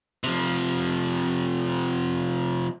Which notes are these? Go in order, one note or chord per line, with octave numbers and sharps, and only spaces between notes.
C3 F3